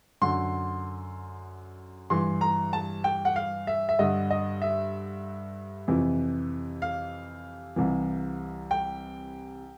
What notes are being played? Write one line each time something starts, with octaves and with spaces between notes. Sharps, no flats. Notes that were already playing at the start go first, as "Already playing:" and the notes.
F#2 D3 C6
G2 E3 C6
A#5
A5
G5
F#5
F5
E5
E5
G2 D3 D#5
D#5
E5
F2 C3 E3
F5
C2 C3 E3
G5